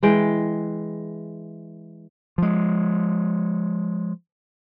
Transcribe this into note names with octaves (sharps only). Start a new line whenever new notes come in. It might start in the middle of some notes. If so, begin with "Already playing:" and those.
E3 G#3 G5
F3 G#3